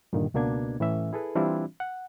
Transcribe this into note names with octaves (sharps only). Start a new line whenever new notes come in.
G2 A#2 D3 D#3
C#2 B2 A#3 D4 G#6
A2 E3 C#4 E5
E4 G#4 A4 B4
E3 G3 C4 D4 E4 F4
F#5